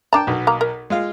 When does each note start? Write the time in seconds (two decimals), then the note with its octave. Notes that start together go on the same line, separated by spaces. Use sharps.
0.13 D4 G5 A5 A#5
0.27 B1 B2
0.47 A#3 A#5
0.61 A#4
0.90 G#3 F4 F5